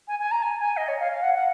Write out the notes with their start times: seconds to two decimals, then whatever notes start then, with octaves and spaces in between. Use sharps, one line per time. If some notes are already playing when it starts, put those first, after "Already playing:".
0.07 G#5
0.19 G#5
0.31 A#5
0.42 G#5
0.59 G#5
0.76 D#5
0.88 C#5
0.99 F5
1.11 F5
1.22 F#5
1.34 F#5